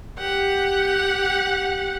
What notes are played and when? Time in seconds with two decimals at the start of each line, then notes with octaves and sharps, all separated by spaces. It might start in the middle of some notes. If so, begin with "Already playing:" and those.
0.18 G4 F#5